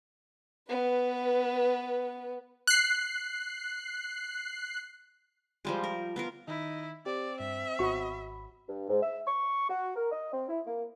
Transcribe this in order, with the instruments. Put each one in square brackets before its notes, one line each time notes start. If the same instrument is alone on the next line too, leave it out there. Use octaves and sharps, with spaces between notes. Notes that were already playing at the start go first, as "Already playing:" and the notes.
[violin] B3 B4
[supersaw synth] F#6 C7
[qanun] F3 G3 G#3
A#4
B3 F4 A#4
[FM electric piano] D#3 [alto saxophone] D#4 [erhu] E4
[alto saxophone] C4 [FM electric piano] G4 [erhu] D5
[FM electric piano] G2 [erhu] E5
[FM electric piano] G#1 B5 [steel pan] F#4 C#6
[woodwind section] G2
G#2
E5
C#6
F#4
A#4
D#5
C4
E4
A#3